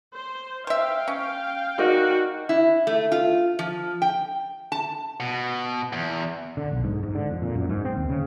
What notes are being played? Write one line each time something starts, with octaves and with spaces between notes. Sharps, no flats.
C5
C5 E5 F5 G5
C#4
D#4 F#4 A#4 D5
E4
A3
F4
F3
G5
A5
B2
E2
D3
B1
G#2
G#2
D3
F2
A#2
F#2
G#2
C4
D#2
C#3